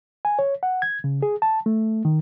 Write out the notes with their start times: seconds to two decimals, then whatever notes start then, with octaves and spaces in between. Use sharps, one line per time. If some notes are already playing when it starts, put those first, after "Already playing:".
0.25 G#5
0.39 C#5
0.63 F#5
0.82 G#6
1.04 C#3
1.23 G#4
1.42 A5
1.66 A3
2.05 D#3